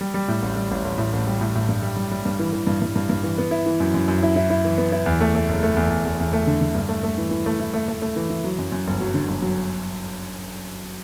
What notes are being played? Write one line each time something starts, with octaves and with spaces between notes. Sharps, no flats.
G3
G3
A2
A1
G3
A1
A1
A2
A1
G3
A2
A2
G2
G3
G3
G3
G2
E3
E3
G2
G2
G2
G2
E3
B3
E4
E3
F#2
F#2
F#2
E4
E4
E4
E3
B3
E4
E2
A3
A3
F#1
A3
E2
E2
E2
E2
A3
D3
D3
G2
A3
A3
E3
E3
A3
E4
A3
A3
A3
E3
E3
F#3
F#2
F#2
G1
F#3
D3
G1
F#3